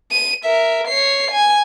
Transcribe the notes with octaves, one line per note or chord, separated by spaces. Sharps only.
D#7
A#4 E5
C#5 C7
G#5